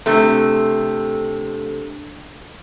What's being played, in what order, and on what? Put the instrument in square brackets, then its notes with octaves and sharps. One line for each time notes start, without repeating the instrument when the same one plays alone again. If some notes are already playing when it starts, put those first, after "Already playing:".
[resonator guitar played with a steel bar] C3 A3 [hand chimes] D4 A4